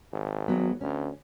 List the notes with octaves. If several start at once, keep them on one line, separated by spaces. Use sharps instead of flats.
G#1
F#3 B3
D2 C#4